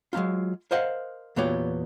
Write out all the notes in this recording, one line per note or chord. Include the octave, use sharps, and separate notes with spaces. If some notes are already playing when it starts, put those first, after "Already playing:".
F#3 G#3 C#4 D#4 F4
A#4 C5 D#5 F5 F#5
E2 A#2 B3 F#4 G4 C#5